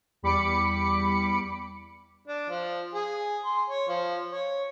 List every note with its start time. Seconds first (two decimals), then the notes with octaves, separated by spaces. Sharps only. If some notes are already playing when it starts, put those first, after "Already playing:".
0.23 E2 G3 B5 D6 C#7
2.28 D4
2.50 F3
2.94 G#4
3.45 C6
3.69 C#5
3.88 F3
4.32 C#5